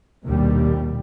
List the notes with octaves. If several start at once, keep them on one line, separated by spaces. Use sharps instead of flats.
A#1 D#2 B2 G3